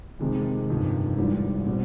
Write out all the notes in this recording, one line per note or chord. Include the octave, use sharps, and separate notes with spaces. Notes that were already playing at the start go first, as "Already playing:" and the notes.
F2 C3 D#3 G#3
G1 F2 C3 D#3
G#1 G#2 E3 G3
B2 G3 C4